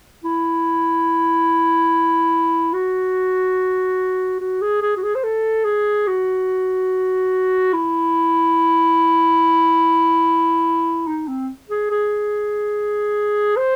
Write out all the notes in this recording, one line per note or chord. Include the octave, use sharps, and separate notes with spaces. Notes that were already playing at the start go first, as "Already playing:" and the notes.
E4
F#4
F#4
G#4
G#4
F#4
G#4
C5
A4
G#4
F#4
E4
D#4
C4
G#4
G#4
C5